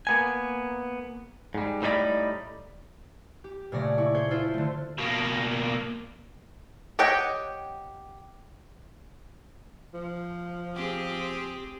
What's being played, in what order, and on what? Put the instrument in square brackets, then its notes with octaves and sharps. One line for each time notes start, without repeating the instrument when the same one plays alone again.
[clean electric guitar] A#3 B3 G#5
G#2 G3
A2 G3 D#4 E4 D5 B5
[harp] G4
A#2 C#3 A3 C#5 D5 A#6
E4 C#6
G#4 C5 C#5 G6
E4 F4 A4 C5
D3 A3
[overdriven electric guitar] B2 A#3
[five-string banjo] G4 C#5 D#5 F#5 G5
[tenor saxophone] F3
[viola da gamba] C4 G4 G#4